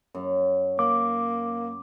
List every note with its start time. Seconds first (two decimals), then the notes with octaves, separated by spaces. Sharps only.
0.15 F#2
0.79 A#3 D6